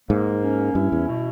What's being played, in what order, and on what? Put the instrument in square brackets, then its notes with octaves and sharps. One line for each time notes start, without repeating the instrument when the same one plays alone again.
[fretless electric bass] G#2 [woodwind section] A#3
[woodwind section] C#4
[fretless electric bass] G2 [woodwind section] E4
[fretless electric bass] E2
[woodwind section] B2